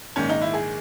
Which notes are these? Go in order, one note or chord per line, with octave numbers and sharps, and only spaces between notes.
A#1 G#2 D#3 C#4
D#4
E4
G#4